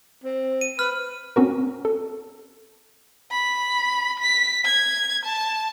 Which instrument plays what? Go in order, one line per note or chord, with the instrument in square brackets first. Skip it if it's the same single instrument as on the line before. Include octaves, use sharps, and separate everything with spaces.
[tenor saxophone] C4
[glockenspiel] D#7
[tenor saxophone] B4 [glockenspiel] F6
[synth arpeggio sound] C4 C#4 F#4 A#4
A4
[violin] B5
B6
G#6
A5